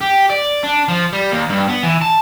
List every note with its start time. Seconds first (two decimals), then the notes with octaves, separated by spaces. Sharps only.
0.01 G4
0.30 D5
0.63 D4
0.88 F3
1.13 G3
1.32 D#2
1.50 G2
1.68 B3
1.83 E3
2.01 A5